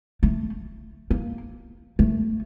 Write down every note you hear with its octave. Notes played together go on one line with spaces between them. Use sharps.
A3
A#3
A3